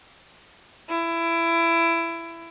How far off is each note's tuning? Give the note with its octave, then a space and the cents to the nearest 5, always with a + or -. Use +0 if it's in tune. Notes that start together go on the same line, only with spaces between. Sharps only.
E4 +20